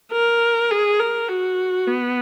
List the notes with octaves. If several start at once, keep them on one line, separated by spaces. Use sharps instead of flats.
A#4
G#4
A#4
F#4
B3